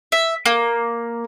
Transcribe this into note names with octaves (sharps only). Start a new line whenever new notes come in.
E5
A#3